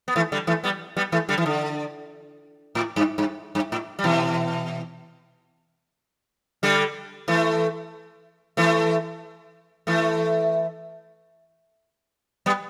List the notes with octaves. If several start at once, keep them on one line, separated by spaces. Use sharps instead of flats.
B3
E3 A3
D3 G3
E3 A3
G3 B3
G3 B3
E3 A3
D3 G3
E3
D3
A2
G2
G2
G2
A2
G3
B2 E3
D3 G3
E3 A3
E3 A3
E3 A3
G3 B3